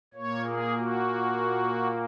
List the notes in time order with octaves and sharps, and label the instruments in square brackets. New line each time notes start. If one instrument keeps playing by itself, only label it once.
[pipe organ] A#2 A#3 C#5
G#4
F#4